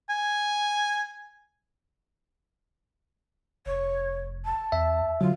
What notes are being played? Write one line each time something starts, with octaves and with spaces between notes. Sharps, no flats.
G#5
F1 C#5
A5
E2 E5
D3 F#3 F4